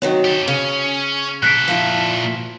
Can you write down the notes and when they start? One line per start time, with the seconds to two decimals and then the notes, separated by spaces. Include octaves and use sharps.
0.02 D#3 F#3 C4 C#5
0.25 G4 A4
0.48 C#3 C#4
1.43 A#2 A4 F#6 B6 D7
1.68 F3 E4